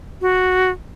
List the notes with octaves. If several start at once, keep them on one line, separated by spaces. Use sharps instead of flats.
F#4